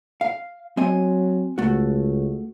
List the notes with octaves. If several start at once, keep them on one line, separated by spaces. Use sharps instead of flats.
F5
F#3 C4 D#5 G#5
C#2 A3 F#4